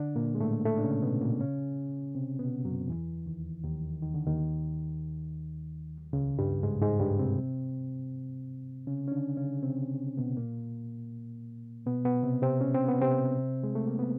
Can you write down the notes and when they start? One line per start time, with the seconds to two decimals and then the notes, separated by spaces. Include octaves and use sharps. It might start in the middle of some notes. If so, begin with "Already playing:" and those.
Already playing: D3 D4
0.15 A#2 A#3
0.35 G#3
0.40 A2 A3
0.65 A2 A3
0.78 D4
0.83 C#3 C#4
1.02 B2 B3
1.21 A#2 A#3
1.40 C#3 C#4
2.15 C3 C4
2.39 B2 B3
2.65 F#2 F#3
2.89 E2 E3
3.26 D#2 D#3
3.64 D#2 D#3
4.02 D#3
4.14 D3
4.27 D#2 D#3
6.13 C#2 C#3
6.39 G2 G3
6.63 G#2 G#3
6.81 G#2 G#3
7.00 G2 G3
7.19 C3 C4
8.87 C#3 C#4
9.08 C#4
9.12 D3 D4
9.37 C#3 C#4
9.62 C3 C4
10.17 B2 B3
10.37 A#2 A#3
11.86 B2 B3
12.05 B2 B3
12.23 C3 C4
12.42 C3 C4
12.61 C#4
12.74 C4
12.89 B3
13.02 C3 C4
13.63 G#3
13.75 A3
13.87 A#3
13.99 B3